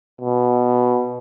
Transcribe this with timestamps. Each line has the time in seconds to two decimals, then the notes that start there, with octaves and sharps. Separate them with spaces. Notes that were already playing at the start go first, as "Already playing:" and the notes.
0.21 B2